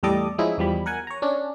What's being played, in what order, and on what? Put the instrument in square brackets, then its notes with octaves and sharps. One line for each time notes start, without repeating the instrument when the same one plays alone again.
[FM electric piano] E2 A2 G3 A4 D#5 D6
F3 G#3 C#4 D#4 E4
E2 F3 G3 B5
A#4 F#5 G#5
C#5 A#5
C#4 D4